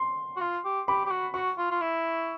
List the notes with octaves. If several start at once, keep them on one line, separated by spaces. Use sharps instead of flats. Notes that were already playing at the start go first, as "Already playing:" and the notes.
Already playing: C6
F#4
F4
G4
G4 B5
G4
F#4
F#4 C#6
F4
F4
E4